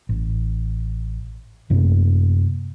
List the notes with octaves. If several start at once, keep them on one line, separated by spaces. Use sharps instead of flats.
A1
F#2 C3 A3 A#3